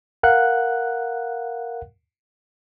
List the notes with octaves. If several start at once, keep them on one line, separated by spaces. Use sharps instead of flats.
A#4 F5 F#5 F#6